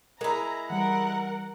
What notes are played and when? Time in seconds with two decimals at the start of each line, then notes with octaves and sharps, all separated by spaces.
0.21 G#3 E4 A#4 A#5
0.70 E3 G3 A#4 F#5